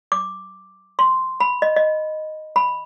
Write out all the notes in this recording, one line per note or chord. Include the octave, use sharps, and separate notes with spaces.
D6
C6
B5
D#5
D#5
B5